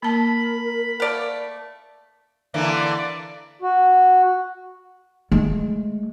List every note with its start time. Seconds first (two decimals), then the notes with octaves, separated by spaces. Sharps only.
0.03 A#3 A#4 A5 B5
1.00 A3 D5 F5
2.54 D3 E3 A#3 D5
3.62 F#4
5.32 G#3 A3